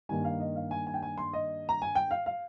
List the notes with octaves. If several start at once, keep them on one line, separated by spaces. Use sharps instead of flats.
G2 D#3 A#3 G#5
F5
D#5
F5
G#5
G#5
G5
G#5
C6
D#5
A#5
G#5
G5
F5
F5